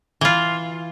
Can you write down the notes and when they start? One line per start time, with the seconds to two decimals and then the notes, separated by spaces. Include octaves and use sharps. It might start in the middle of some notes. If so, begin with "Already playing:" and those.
0.21 E3 F4